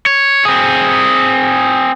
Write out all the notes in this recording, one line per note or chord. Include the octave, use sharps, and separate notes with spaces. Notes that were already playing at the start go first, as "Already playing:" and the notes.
C#5
C4 G#4